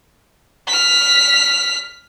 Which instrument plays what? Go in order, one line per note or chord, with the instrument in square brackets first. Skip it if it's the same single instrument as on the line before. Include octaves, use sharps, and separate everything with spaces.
[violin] F6 B6